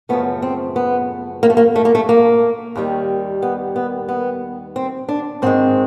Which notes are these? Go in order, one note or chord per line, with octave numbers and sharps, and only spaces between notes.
F#2 C#3 F3 A3 B3
C4
B3
A#3
A3
A#3
A3
A#3
A3
A#3
D#2 D#3 G3
B3
B3
B3
C4
D4
G#2 D#3 G#3 C4